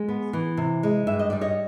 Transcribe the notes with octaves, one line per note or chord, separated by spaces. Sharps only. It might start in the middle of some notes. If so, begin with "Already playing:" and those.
Already playing: G#3
B3
E3
C3
G#3
G2 E5
D#5
G3 D5
C#5 D#5